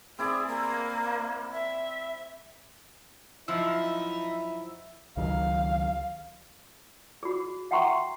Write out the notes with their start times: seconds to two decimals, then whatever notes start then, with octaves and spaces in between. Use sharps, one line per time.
0.19 C4 E4 G#4 D5
0.48 A#3
1.51 E5
3.48 F#2 F3 D#4 E4 E5 E6
5.17 C#2 D#3 F#3 F5
7.23 F#4 G#4
7.71 E5 F#5 G5 A#5 C6 C#6